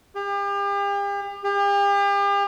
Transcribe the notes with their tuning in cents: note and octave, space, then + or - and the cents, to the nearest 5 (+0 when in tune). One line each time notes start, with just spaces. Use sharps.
G4 +40
G4 +40